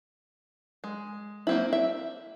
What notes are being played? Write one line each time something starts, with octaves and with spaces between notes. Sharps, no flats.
G#3
A#3 C4 E4
E5